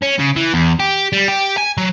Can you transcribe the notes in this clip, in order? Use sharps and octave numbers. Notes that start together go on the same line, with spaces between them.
C#4
C#3
E3
E2
G4
G3
G4
G#5
F#3